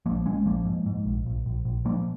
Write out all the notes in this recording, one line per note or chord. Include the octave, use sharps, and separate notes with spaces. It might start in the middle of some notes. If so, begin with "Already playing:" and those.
A#1 F3 A#3
A#1 G#3 C#4
A#1 F3 A#3
G#2
G#2
A#1
A#1
A#1
A#1
A#2 F3 A#3